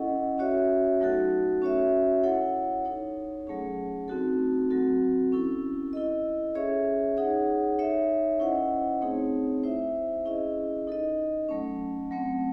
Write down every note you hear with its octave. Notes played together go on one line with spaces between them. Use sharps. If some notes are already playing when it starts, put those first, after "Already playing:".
Already playing: C#4 E4 A4 D#5 F#5
C#4 F#4 C#5 E5
F#3 A3 D#4 F#4 A4
C#4 F#4 C#5 E5
E4 A4 C#5 F#5
D#4 A4 C#5
F#3 A3 C#4 G#4
A3 C4 D#4 F#4 A4
F#3 C4 F#4 A4
C#4 E4 A4
E4 A4 D#5
C#4 G#4 C#5 E5
D#4 G#4 C#5 F#5
D#4 A4 C#5 E5
C#4 E4 C5 D#5 F#5
A3 C4 D#4 G#4 C#5
E4 C5 E5
C#4 E4 G#4 D#5
D#4 A4 D#5
F#3 A3 C#4
F#3 A3 C4